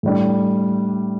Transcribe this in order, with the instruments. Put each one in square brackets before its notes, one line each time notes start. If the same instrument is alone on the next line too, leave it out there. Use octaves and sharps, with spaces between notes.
[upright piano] A2 G3 D4